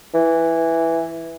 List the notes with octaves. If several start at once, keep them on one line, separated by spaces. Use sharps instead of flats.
E3